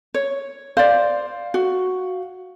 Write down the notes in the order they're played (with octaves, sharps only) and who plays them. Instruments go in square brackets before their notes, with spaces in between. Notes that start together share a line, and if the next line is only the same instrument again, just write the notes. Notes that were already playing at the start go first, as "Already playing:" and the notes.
[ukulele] C#5
[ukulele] C5 D5 [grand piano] F5
[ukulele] F#4